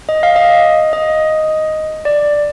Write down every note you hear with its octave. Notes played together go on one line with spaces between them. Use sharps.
D#5
F5
D#5
D#5
D5